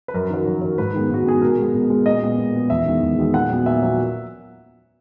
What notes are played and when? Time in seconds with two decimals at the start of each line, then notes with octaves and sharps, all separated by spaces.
0.08 B4
0.14 F#2 A#4
0.30 D#3 F#3
0.46 F#2
0.62 D#3 F#3
0.78 G#2 B4
0.94 D#3 G#3 B3
1.10 G#2 F#4
1.26 D#3 G#3 B3 G#4
1.42 B2 A#4
1.59 G#3 B3
1.74 B2
1.90 G#3 B3
2.06 A#2 D#5
2.22 G#3 B3
2.38 A#2
2.55 G#3 B3
2.70 E2 E5
2.86 D#3 G#3 B3
3.02 E2
3.18 D#3 G#3 B3
3.34 A#2 F#5
3.50 F#3 B3
3.66 A#2 E5
3.82 F#3 B3